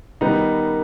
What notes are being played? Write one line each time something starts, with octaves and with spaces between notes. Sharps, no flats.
D#3 G3 B3 D#4